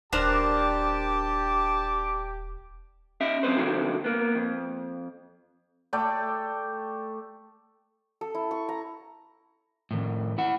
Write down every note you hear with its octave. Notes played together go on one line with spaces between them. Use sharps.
D#1 D4 G4 A#4 C5 A5 D6
C#4 D#5 E5
F#2 B2 C4 B4 C5
D3 D#3 F3 F#3 A3 C4
A#3 B3
F2
A3 D5 G5
A4
E4
C#6
A#5
A2 D#3
E4 F#5